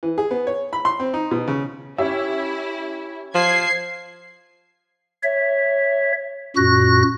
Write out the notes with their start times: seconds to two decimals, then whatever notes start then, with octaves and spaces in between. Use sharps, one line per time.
0.03 E3
0.18 G#4
0.31 B3
0.47 C#5
0.73 B5
0.85 C6
1.00 C4
1.14 D#4
1.31 B2
1.48 C#3
1.98 C#4 E4 G4 E5
3.35 F3 G#6 C7
5.23 C#5 E5
6.57 F#2 A#2 F#4 F#6 A#6